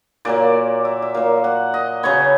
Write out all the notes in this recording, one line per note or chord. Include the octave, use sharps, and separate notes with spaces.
A#2 F#3 A#3 D5
E5
E5
A#2 F#3 A#3 F5
F#5
D#5
C#3 F#3 B3 C#5